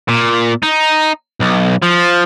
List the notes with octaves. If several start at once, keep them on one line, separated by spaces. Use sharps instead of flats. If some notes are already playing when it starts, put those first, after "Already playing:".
A#2
D#4
B1
F3